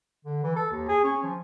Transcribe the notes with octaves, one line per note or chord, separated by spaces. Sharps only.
D3
E3
A4
D#2
G#4
C#4
F3